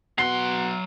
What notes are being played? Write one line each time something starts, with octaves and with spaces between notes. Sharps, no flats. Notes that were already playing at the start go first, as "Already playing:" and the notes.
B2 F#3 F#5 C6 C7